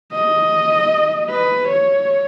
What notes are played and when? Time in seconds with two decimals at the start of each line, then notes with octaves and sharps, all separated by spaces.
0.12 D#5
1.30 B4
1.68 C#5